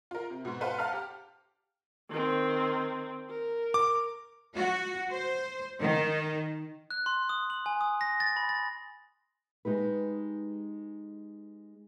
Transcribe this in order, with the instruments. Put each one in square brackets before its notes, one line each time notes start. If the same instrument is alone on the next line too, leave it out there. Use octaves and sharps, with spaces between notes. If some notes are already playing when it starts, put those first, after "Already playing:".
[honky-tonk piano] F4 A#4
C3
G#2 B2
A4 B4 C5 F5 F#5
F5 F#5 A5 A#5 F6
G4
[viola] D#3 C4
A#4
[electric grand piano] D6
[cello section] F#4
C5
D#3
[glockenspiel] F#6
C6
D#6
F#7
G#5
D#6
A#6
A6
B5
A6
[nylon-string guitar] G#3 D#4 G4 B4